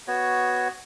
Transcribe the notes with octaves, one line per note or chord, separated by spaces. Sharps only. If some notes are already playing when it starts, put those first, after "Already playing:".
B3 F#4 C#5